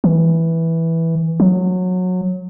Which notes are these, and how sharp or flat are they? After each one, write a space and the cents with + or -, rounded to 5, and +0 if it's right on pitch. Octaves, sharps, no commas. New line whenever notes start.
E3 -5
F#3 -20